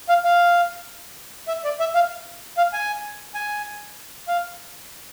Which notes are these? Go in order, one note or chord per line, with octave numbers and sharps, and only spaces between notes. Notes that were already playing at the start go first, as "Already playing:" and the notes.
F5
F5
E5
D5
E5
F5
F5
G#5
G#5
F5